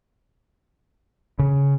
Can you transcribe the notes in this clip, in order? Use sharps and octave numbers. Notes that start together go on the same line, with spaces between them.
C#3